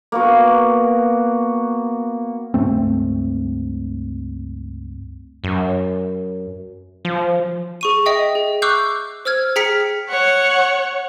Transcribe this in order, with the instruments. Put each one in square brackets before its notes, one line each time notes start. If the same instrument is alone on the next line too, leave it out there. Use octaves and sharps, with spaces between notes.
[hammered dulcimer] A#3 B3 F#4
[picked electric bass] C#2 G2 A3 C4
[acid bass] F#2
F3
[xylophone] G#4 C#6 D#7
D#5 E5 G5 D#6
G#4
C#6 D6 E6 F#6 G6 C7
C5 E6 F6 G#6
G#4 G5 A#5 F6 B6 C#7
[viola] C#5 F#5